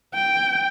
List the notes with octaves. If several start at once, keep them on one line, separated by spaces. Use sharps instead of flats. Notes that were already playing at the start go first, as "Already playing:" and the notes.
G5